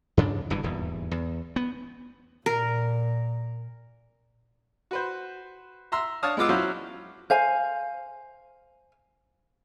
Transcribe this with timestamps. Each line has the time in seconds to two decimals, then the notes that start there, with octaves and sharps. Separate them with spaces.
0.17 G2 C#3 D4
0.50 F#1 G2 D3 E3
0.63 D#1 E2 G#2
1.11 E2
1.56 B3
2.46 A#2 A#4
4.91 F#4 B4 C5
5.92 E5 A#5 C6 E6
6.23 D4 C#5 F5 A5 D#6 F6
6.37 G#3 B3 F4 D6 E6
6.49 F#3 C#4 E4 F#4 C5 F5
7.30 C5 F5 G#5